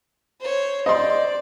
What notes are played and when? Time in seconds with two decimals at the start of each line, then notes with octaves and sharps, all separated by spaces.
0.41 C5 C#5
0.86 C5 D5 D#5 C6